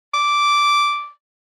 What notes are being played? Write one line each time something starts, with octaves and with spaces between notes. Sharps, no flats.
D6